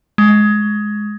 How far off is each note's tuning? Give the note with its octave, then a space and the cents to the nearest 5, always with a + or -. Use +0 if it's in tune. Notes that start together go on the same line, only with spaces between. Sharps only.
G#3 +15